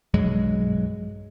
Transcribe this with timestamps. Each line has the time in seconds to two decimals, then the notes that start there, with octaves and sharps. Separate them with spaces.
0.14 B1 G2 F#3 G#3